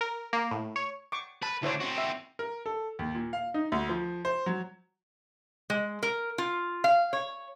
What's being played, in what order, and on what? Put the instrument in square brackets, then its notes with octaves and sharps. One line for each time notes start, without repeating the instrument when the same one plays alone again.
[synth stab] A#4
A#3
A2
C#5
[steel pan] C#6 D6
[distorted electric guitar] B4 [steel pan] A5
[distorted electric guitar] D2 D4 [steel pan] E4 C5 C#5
[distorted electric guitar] C4 F#4
[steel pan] E5
[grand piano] A#4
A4
D#2
A#2
F5
D#4
D2
F3
C5
F#3
[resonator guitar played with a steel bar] G#3
A#4
F4
F5
C#5